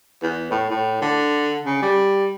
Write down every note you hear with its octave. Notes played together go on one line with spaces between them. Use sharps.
E2
A2
A2
D3
C#3
G3